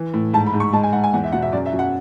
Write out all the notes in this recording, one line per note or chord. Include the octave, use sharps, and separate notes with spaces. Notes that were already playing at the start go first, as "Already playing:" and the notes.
Already playing: E3
A2
G#2 A5
B5
G#2
C#6
G#3 A5
G#5
G#2 F#5
G#5
E2 F#5
E5
B2 F#5
E5
F#2 D5
E5
F#2
F#5